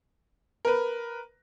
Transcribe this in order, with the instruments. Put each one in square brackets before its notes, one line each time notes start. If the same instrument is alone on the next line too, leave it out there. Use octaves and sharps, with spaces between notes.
[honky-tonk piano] A#4 B4